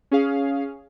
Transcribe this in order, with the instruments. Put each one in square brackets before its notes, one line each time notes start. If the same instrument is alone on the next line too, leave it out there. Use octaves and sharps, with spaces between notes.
[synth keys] C#4 G#4 F5